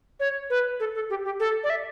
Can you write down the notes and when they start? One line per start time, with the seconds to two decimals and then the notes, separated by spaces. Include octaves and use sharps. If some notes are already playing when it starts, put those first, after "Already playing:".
0.20 C#5
0.50 B4
0.80 A4
0.95 A4
1.10 G4
1.25 G4
1.40 A4
1.63 D5
1.70 E5